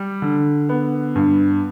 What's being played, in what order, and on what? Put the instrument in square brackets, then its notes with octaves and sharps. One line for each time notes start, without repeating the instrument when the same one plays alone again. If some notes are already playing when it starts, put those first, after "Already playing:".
Already playing: [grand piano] G3
D3
B3
G2